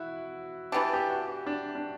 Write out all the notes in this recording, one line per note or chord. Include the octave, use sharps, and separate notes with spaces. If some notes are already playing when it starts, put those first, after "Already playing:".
Already playing: E4 F#4
E3 B3 D4 G4 A4
G4
F#4
D4
D4